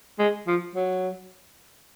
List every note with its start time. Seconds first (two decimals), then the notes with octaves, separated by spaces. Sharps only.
0.19 G#3
0.47 F3
0.75 F#3